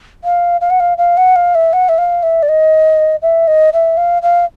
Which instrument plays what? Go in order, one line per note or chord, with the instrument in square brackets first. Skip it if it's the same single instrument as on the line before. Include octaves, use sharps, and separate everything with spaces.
[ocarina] F5
F5
F#5
F5
F5
F#5
F5
E5
F#5
E5
F5
E5
D5
D#5
E5
D#5
E5
F5
F5